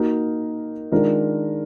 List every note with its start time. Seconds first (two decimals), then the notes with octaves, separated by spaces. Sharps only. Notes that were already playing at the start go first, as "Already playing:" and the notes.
Already playing: A#3 D#4 F#4 A#4
0.92 D#3 G#3 D4 F4 A#4